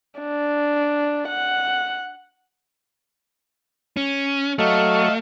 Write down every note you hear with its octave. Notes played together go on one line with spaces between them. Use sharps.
D4
F#5
C#4
F#3 A3 A4 D#5 F5 C#6